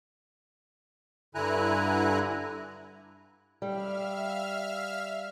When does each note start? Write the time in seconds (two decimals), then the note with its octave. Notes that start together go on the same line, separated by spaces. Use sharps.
1.35 G2 D3 E4 G#5 A#5 F#6
3.62 G3 E5 F5 F6